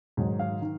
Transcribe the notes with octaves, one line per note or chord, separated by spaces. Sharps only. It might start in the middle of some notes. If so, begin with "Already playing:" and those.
G#2 D#3 F#3
F5
D#3